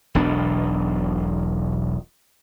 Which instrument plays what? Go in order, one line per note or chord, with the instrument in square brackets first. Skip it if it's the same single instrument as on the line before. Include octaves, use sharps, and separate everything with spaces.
[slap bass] E1 B1 B3 D4